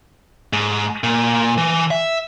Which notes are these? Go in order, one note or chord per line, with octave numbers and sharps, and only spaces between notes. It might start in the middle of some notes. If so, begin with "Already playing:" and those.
G#2
A#2
E3
E5